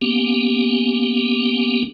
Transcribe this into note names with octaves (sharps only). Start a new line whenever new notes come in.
A#3 B3 C#4 G4